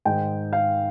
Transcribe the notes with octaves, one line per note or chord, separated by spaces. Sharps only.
G#2 D#3 G#3 G5
F5